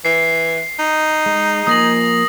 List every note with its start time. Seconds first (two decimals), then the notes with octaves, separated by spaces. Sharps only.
0.05 E3 C7
0.79 D#4
1.26 G#3
1.67 F3 A#3 G#5 D#6 A#6 F#7